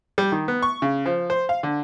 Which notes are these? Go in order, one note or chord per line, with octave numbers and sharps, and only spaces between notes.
G3
D#3
B3
C#6
C#3
F3
C5
F5
D3